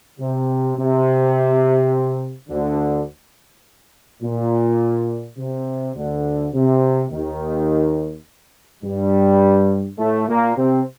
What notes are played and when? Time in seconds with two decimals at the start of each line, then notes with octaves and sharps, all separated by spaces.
0.19 C3
0.77 C3
2.49 D2 D3
4.22 A#2
5.37 C3
5.95 D2 D3
6.53 C3
7.11 D#2 D#3
8.83 G2 G3
9.99 A2 A3
10.28 A#2 A#3
10.56 C3 C4